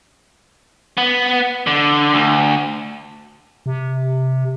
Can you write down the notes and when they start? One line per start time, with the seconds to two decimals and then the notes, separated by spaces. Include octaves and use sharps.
0.98 B3
1.67 D3
2.14 D2
3.66 C3